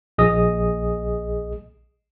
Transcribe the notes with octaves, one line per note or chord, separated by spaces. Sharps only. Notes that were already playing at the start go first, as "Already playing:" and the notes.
A#1 G#4 D#5 D#6